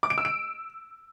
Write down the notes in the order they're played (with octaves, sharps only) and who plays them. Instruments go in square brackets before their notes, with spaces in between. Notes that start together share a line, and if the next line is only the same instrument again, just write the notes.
[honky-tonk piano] D6
D7
E6
D7